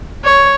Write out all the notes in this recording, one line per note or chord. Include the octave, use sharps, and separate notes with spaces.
C#5